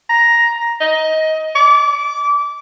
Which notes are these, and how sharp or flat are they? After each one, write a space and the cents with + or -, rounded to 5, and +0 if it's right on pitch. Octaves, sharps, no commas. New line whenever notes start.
A#5 +10
D#5 +20
D6 -25